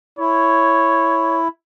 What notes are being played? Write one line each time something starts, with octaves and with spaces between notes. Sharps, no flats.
E4 C#5